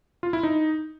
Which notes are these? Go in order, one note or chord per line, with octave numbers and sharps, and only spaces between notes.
F4
E4
D#4